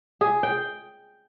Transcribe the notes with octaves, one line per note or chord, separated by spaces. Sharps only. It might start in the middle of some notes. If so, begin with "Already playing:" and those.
G#4
G5